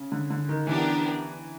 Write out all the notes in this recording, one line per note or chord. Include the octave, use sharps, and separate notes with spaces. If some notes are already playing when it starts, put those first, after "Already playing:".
Already playing: C#3
D3
D3
D#3
E3 B3 D4 G4 A#4